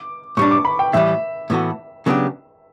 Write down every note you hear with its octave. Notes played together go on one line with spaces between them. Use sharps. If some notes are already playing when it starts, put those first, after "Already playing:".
Already playing: D6
A2 G3 D4 C#6
D6
B5
G5
A2 E3 G3 E5
A2 E3 B3 F#4 A4
C#3 F#3 B3 D4 G4